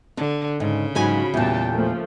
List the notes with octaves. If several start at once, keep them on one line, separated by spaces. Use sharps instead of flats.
D3 D4
G#2 C#3
G#2 F3 F#3 F#4 G#5 B5
E2 A#2 G3 G5 A5
F3 A3 A#3